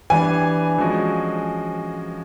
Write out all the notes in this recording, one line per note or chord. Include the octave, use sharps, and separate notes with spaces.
E3 G3 B3 D4 G#5
F3 G#3 C#4 F#4